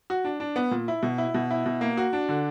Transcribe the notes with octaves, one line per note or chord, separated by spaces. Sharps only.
F#4
D4
D4
B3
A#2
E4
B2
E4
B2
E4
B2
A#3
F#4
D4
D3